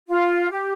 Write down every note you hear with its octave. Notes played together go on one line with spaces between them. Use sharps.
F4
G4